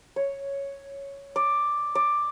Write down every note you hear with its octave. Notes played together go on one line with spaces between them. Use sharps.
C#5
D5
D5